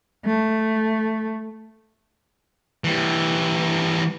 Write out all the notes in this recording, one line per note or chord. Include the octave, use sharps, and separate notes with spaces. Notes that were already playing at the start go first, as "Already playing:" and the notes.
A3
E3 G3